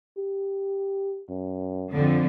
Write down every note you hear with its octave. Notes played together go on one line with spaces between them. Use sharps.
G4
F#2
F2 D3